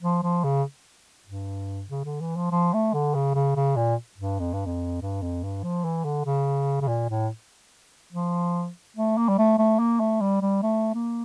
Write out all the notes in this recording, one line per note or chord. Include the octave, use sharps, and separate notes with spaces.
F3
F3
C#3
G2
C#3
D3
E3
F3
F3
A3
D3
C#3
C#3
C#3
A#2
G2
F2
G2
F2
G2
F2
G2
F3
E3
D3
C#3
C#3
A#2
A2
F3
A3
A#3
G3
A3
A3
A#3
A3
G3
G3
A3
A#3